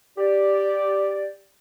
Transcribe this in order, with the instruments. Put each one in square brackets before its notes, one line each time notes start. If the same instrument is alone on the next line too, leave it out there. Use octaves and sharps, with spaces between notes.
[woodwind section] G4 D5